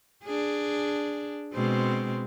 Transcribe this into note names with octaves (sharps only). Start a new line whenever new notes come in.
D4 G#4
B2 G#3 C4